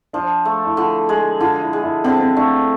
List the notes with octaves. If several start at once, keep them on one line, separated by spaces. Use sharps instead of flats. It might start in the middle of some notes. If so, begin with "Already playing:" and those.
F3 D4
A3
E4
D3 F4
G#3
D3 F4
E4
G#3
E4
D3 C4
C4
A3 D4